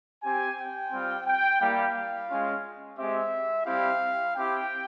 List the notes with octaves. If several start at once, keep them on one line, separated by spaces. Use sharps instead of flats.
C4 G4 G#5
G5
G3 C4 F4
G5
G3 A#3 E4 G4 F5
G#3 C#4 F4
G#3 C4 G4 E5
G3 C4 E4 G4 F5
C4 E4 G4 G5